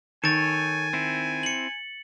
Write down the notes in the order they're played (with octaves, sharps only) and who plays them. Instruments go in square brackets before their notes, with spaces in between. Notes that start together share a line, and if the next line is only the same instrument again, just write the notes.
[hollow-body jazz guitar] D#3 [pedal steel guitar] A4 C#5 [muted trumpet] G#5 [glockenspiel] A6 D7
[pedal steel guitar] C4 E4
[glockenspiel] C#7 F#7